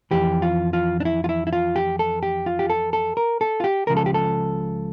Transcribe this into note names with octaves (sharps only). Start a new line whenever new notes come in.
F2 E3 G4
F4
F4
D4
E4
F4
E4
E4
F4
G4
A4
G4
F4
G4
A4
A4
A#4
A4
F4
G4
C#2 C#3 F3 A#4
A4
G4
A4